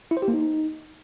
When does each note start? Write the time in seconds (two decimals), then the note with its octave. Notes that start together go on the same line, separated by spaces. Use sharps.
0.11 E4
0.17 C5
0.22 G4
0.28 A#3
0.34 D#4